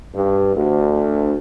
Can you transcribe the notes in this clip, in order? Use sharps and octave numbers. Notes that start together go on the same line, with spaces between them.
G2
D2